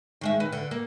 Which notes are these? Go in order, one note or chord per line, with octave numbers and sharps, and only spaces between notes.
D#3 G#3 E5
B4
D3
A#3